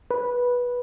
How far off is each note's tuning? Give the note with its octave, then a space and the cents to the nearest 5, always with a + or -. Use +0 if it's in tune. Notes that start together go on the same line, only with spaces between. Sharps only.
B4 -10